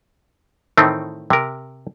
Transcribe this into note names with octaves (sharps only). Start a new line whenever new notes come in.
A2 D#3 E3 A3 C4 D#4
C3 A#4